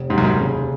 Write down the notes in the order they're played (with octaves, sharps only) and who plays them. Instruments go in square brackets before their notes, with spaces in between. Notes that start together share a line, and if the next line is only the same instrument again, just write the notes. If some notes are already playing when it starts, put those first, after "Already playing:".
Already playing: [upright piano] F1
[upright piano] D#2 [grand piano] G#2
[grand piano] F#2
G#2
[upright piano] C#3